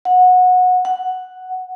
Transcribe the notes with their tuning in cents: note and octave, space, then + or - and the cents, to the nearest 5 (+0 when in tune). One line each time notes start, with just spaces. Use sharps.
F#5 -20
F#5 +0